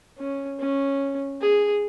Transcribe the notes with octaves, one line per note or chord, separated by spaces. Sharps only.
C#4
C#4
G#4